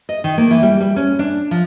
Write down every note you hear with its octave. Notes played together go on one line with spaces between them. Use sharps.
D#5
D#3
A#3
E3
G3
G3
C#4
D4
F3